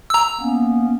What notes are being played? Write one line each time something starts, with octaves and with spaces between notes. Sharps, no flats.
A#5 E6
A#3 B3 C#4